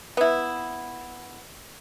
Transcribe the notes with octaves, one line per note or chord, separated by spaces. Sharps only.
B3 E4